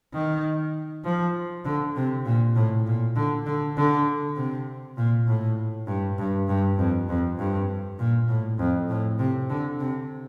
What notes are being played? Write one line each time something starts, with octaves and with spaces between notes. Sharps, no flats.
D#3
F3
D3
C3
A#2
A2
A#2
D3
D3
D3
C3
A#2
A2
G2
G2
G2
F2
F2
G2
A#2
A2
F2
A2
C3
D3
C3